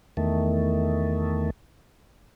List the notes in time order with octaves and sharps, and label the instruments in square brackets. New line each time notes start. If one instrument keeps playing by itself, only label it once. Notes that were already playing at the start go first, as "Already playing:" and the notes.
[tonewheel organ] E2 D#3 A3